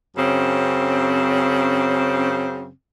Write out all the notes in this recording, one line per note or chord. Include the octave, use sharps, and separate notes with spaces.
F#2 C#3 C4